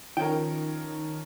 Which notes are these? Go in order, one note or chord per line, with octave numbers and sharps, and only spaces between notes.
D#3 F3 C#4 A#4 G5